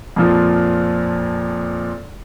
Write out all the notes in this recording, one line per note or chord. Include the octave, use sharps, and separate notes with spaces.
F2 A#2 F3